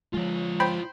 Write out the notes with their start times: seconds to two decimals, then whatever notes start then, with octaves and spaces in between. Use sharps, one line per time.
0.14 F3 G#3 F4 C#5
0.60 C5 G5 B5